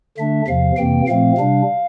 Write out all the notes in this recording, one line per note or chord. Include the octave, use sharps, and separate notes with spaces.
D3 A3 D4 E5
E2 C3 F3 F5
F2 C3 E3 A#3 G5
A#2 F3 A3 C4 F5
C3 G3 D4